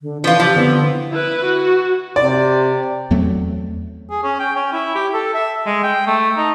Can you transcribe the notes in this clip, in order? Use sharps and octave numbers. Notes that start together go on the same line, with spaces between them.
D3
E3 F3 F4
F3 G4 E5 B6
D3 B3 C4 E4
E4 B4
F#4
C3 D5
E2 F#3 A3 C4
G#4
C#4
G5
C#4
E4
G4
A4
E5
G#3
G5
A3
D#4